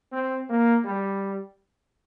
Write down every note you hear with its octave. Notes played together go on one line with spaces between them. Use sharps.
C4
A#3
G3